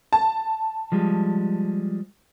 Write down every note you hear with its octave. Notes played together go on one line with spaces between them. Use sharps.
A5
F3 G3 G#3